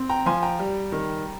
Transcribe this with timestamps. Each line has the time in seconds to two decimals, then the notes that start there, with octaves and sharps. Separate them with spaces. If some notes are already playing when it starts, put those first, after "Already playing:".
Already playing: C4
0.09 G5 A#5
0.26 F3 G#5 C6
0.43 G5 A#5
0.59 G3
0.92 D#3